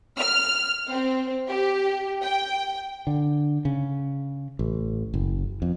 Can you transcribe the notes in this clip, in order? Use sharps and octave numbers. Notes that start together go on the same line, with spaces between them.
F6
C4
G4
G5
D3
C#3
A1
F#1
F2